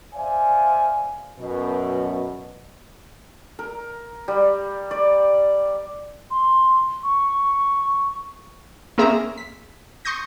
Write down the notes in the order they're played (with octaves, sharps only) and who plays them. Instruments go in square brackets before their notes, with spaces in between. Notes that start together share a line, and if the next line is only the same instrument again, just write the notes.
[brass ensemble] C5 D5 E5 F5 G#5
F#2 B2
[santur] A#4
G3
D5
[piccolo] C6
C#6
[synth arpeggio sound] A#3 C4 C#4 G#4 E5 A#5
B6
C6 C#6 D#6 G6 A#6